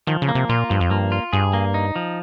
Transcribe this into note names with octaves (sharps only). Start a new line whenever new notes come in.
D#3 F3
C#3
A#3
C3
A#2 F4
G2 F3
F2
G2 A#3
F4
G2 G#4
A#3
D#4
F3